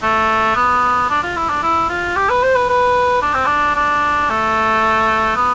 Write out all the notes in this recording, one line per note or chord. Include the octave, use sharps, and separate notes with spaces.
A3
B3
D4
F4
E4
D4
E4
F4
G4
B4
C5
B4
B4
D4
C4
D4
D4
A3
B3